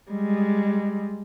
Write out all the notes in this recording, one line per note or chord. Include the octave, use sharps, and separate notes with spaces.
G3 G#3